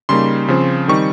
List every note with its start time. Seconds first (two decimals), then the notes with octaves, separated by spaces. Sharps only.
0.09 C#3 G3 A#3 D#4 C6
0.48 C#3 F3 C4
0.88 D#3 G3 C4 D#4 C#6